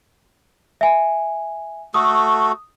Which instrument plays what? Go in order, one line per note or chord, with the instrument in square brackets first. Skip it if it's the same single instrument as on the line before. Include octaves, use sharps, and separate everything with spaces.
[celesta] E5 G#5
[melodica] A3 F#4 A4 [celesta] D#6